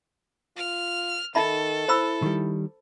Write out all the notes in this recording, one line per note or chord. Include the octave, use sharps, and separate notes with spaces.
F4 F6
D#3 D#4 A4 E5 B5
E4 C5 B5 E6
D#3 G3